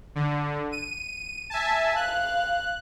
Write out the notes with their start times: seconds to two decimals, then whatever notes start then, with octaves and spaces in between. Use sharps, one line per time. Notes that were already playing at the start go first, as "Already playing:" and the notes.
0.15 D3
0.72 D#7
1.50 E5 G#5 A5
1.96 F5 F#6